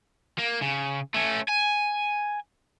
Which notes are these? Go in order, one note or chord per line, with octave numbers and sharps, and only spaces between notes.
A#3
C#3
A3 C#4
G#5